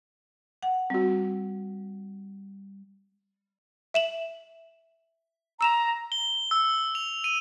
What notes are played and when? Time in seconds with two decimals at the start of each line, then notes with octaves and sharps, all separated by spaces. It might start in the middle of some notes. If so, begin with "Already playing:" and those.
0.63 F#5
0.90 G3 C4 F#4
3.94 E5 E7 F#7
5.61 A#5 E6 E7 F7
6.12 G7
6.51 E6
6.95 F7
7.24 D#7